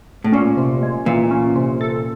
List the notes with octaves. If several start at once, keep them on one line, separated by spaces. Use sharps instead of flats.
A2
A#2 C#4
C3
G#3
A#2 E3
C#4
C3
A4